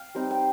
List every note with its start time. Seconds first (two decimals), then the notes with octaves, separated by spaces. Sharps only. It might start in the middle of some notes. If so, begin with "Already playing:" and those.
Already playing: F5 G5
0.15 G3 C4 D#4
0.31 G5